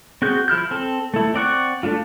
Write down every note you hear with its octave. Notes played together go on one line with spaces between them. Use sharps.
C4 F#4 G#4 G6
F3 E4 F6 G6
C4 A4
A3 E4
C4 D5 F#5 C#6
A3 D4 F4